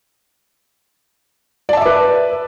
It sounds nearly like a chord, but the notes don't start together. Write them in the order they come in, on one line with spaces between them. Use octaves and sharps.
D5 A5 E5 D6 B4